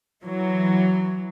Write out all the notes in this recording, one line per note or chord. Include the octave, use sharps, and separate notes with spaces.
E3 F#3